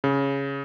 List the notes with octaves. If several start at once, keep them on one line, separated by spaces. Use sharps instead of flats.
C#3